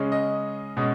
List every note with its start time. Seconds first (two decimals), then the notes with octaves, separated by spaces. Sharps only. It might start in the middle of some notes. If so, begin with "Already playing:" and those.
Already playing: C#3 G#3 C#4
0.12 D#5
0.77 B2 G#3 C#4